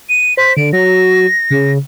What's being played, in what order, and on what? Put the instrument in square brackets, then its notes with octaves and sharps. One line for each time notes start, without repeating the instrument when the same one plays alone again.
[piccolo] D#7
[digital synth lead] C5 [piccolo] B6
[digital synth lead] D3 [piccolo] D7
[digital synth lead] F#3 [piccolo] A#6
[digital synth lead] C#3